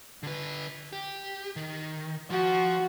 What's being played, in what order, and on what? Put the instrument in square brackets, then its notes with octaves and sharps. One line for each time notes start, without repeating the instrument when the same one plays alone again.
[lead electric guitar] D3 B4
G4
D#3
[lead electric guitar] F3 F4 [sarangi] F#4